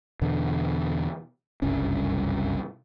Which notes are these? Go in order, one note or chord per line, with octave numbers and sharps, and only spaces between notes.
E2 B2 D3
F#1 C2 G2 C#4